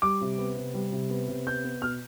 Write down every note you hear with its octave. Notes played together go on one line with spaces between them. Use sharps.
G3 D6
C3
B3
C3
G3
C3
B3
C3
B3 G6
B3
B2 F6